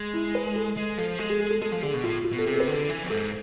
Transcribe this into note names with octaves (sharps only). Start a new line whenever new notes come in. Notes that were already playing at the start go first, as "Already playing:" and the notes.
Already playing: G#3
E4
B4
A4
G#3
F3 A4
G#3 A4
G#4
G#4
A4
G#3 A4
F3
D3 G#4
B2
A2 F4
F4
B2
A4
C3 G#4
A4
B4
D3
A4
E3
F2
G#2 A4